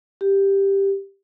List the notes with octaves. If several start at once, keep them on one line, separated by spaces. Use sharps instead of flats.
G4